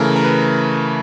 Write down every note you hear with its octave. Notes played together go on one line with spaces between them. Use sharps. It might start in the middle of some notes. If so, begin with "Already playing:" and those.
Already playing: C#3 E3 A3 A#4
A#4
B4